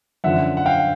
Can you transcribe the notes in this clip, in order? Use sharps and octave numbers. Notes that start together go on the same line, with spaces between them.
F#2 D3 F3 E5 F#5
F#5
F5 G5